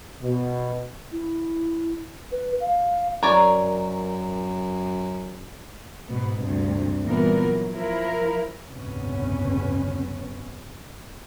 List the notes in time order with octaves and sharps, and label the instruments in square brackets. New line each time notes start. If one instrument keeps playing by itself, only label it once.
[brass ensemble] B2
[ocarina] E4
B4
F5
[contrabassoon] F#2 [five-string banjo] A#4 C#5 D5
[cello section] G#2 B2 B3
D2 G2 C3
A#2 E3 G3 B3 A#4
F#3
F3 E4 A#4
[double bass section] F#1 D2 G#2 C3 B3 C#4